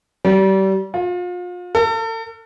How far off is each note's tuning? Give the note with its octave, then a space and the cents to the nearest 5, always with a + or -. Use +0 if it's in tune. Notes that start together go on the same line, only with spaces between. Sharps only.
G3 -30
F4 +35
A4 +40